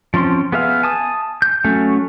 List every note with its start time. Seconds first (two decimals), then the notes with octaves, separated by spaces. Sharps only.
0.14 F3 C4 C#4 C6
0.52 B3 G#4 E5 F5
0.83 G#5 A5 D#6
1.42 G6
1.64 F#3 A3 C#4